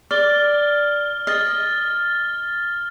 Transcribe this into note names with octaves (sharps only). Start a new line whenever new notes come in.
D5 F6 G7
D#5 F6 A6 G7